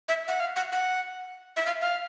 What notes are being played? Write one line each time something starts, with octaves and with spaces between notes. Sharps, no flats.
E5
F#5
F5
F#5
F#5
E5
F5
F5